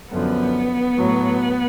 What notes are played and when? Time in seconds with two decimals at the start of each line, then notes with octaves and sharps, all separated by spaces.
0.13 F#2 D3 F3 B3
0.97 A2 F#3